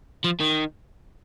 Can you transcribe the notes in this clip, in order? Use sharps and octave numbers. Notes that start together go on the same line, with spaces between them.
F3
D#3